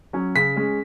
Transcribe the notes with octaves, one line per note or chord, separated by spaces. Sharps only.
F#3 C#4
C#3 B6
G#3 C#4